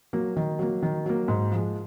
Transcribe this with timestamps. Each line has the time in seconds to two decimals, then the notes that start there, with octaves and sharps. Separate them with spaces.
0.13 F#3 A#3
0.36 D#3
0.59 F#3 A#3
0.82 D#3
1.06 F#3 A#3
1.28 G#2
1.52 F3 G#3